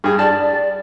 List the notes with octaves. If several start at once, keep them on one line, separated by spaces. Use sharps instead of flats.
G2 G#4
D5 A5